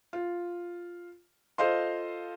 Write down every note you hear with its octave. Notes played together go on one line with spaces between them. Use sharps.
F4
F4 A4 C5 D#5 F5 C6